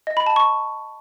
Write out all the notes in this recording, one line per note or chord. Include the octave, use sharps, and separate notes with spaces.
D#5
B5
A5
C#6